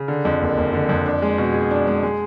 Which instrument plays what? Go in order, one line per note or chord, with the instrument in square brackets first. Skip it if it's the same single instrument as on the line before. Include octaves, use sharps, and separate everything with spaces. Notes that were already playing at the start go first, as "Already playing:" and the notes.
Already playing: [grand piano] C#3
D3
F2
F#1
F#1
D3
F2
D4
G#3
B2
G#4
D4
G#3
G#3